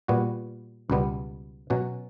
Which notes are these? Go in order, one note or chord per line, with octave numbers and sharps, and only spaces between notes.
A#2 G3 B3 F#4
C#2 B2 G3 B3
B2 F#3 C#4 F#4